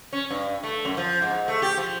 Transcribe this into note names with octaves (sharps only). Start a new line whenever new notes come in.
C#4
G2
A3
F#2
F3
G#2
A3
G4
F3